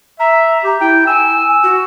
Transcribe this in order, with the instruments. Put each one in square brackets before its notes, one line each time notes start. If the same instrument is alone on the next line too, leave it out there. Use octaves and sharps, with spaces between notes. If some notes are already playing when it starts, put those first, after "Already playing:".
[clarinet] E5 [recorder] A#5
[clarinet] G4
[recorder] E4 [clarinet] G5
[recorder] G#5 [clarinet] E6
[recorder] F#4